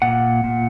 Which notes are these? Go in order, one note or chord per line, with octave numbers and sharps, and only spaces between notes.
A#2 F#5
A#2